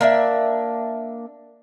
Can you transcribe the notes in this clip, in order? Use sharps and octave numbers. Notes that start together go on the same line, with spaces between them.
A#3 D4 E5